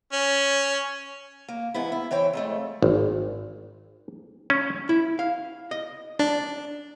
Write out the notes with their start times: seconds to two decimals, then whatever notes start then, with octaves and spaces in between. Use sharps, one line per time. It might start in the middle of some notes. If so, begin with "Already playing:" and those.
0.13 C#4
1.48 A#3
1.74 G#2 E3 B3 E4
1.92 E4
2.11 E3 C5 C#5 G5
2.33 F2 G#3 A3
2.82 G#1
4.50 C#4
4.89 E4
5.19 F5
5.71 D#5
6.19 D4